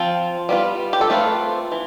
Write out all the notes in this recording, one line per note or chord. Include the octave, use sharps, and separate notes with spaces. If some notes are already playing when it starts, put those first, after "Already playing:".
Already playing: F3 C4 F4
G3 B3 F4
G4
A4
A3 C4 F4 B4
E3